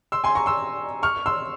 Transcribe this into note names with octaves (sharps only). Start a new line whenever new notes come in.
C6 E6
G#5 C6
A#5 C#6
C6 E6
C#6 F6
C6 E6